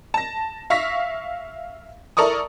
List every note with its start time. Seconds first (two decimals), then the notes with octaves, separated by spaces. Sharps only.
0.14 A5 A#6
0.70 E5 F5 C#6 A#6 B6
2.17 E4 A4 A#4 D5 C#6 D#6